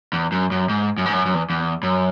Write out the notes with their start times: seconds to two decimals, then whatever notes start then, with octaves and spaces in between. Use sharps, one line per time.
0.13 E2
0.32 F#2
0.51 F#2
0.69 G#2
0.98 F#2
1.06 G#2
1.13 F#2
1.26 F#2
1.34 E2
1.50 E2
1.83 F#2